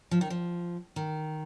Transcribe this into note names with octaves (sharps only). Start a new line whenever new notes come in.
F3
D#3
F3
D#3